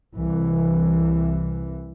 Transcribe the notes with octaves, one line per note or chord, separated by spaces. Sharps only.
C2 E3